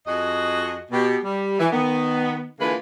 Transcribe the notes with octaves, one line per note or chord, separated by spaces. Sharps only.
F2 F#4 G#4 D#5
B2 G4
G3
E3
D#3 B3
D3 E3 G#3 A#3 F4 B4